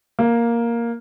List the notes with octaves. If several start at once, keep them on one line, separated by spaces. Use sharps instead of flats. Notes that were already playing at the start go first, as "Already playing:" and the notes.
A#3